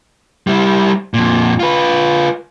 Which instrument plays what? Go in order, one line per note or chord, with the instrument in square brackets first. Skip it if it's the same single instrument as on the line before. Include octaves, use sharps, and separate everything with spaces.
[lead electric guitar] G3 E4
F2 A#2
F4 B4